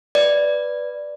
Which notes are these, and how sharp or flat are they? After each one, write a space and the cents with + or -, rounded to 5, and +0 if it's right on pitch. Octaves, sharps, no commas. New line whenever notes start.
B4 +0 D5 +0